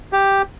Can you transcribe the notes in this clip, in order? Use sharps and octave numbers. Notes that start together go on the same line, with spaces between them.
G4